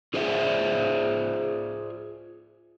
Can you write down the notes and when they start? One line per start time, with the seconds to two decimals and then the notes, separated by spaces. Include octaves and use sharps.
0.14 F4 G#4 C5 D5 E5